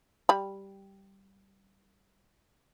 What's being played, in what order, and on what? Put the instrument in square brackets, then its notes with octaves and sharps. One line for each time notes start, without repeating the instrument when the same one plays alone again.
[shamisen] G3 B5